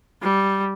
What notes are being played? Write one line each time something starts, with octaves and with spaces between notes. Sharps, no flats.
G3